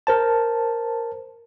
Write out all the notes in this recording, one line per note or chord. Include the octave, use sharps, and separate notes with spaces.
A#4 C5 A5